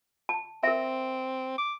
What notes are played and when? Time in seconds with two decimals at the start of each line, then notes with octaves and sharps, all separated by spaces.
0.29 A5
0.63 C4 A#4 E5
1.58 D6